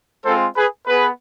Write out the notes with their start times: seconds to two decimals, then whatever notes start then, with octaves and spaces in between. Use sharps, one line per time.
0.24 G#3 C4 F4 A4 C5
0.56 G#4 B4
0.87 B3 G#4 B4